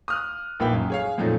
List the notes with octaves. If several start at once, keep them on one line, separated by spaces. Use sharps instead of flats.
D#6 F6 F#6
A#1 A#3 D#4 B4 G5
F#2
G#4 C#5 F5
F2 A#2 F3 F#3 A3 D#4